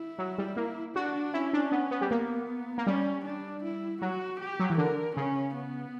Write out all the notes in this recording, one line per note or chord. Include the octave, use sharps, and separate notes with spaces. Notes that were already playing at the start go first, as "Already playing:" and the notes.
Already playing: E4
F#3
G3
A#3
D4 F#4
C#4 E4
D4
B3
B3
G3
A#3 B3
A#3
G3 C#4
D4
E4
F#3 F#4
G4
F#3
E3
D3 A#4
C#3 C#4
B3